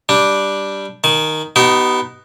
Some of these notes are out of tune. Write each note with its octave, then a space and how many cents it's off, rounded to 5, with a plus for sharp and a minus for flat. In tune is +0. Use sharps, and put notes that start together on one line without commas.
G3 +0 D4 +0
D#3 +0 G#5 +40
B3 +5 D#4 +0 G4 -40